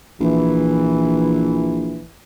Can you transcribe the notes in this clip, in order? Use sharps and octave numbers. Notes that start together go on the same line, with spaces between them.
A#1 E3